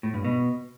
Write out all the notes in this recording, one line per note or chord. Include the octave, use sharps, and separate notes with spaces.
A2
G2
B2